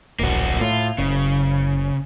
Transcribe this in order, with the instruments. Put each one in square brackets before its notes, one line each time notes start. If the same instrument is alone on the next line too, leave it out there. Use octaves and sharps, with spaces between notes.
[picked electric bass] D1 A#1 [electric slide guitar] A#3 F#4
[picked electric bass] A2 [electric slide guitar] F4
[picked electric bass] F#1 [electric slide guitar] C#3